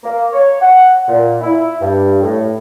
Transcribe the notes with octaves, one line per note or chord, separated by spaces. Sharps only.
A#3
C#5
F#5
A#2
E4
G2
A2